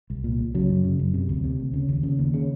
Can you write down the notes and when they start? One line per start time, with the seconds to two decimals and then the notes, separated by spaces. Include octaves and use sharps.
0.10 C2
0.24 A#2
0.39 C2
0.54 C#3 F#3
0.69 F#2
0.84 C#3
0.99 F#2
1.14 C3
1.29 D2
1.44 C3
1.59 D2
1.74 C#3
1.89 D#2
2.03 C#3
2.19 D#2
2.34 C#3